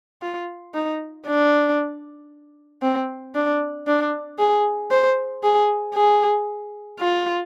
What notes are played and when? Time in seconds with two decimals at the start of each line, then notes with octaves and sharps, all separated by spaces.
0.22 F4
0.74 D#4
1.26 D4
2.82 C4
3.35 D4
3.87 D4
4.38 G#4
4.91 C5
5.43 G#4
5.95 G#4
6.99 F4